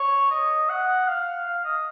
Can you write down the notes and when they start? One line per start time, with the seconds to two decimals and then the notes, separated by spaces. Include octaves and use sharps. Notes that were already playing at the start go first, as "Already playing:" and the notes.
Already playing: C#5
0.31 D#5
0.69 F#5
1.07 F5
1.46 F5
1.65 D#5